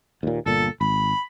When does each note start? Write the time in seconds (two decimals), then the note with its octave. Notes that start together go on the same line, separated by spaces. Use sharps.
0.23 D#2 A#2
0.46 G1 A#2 A4
0.81 G#1 B5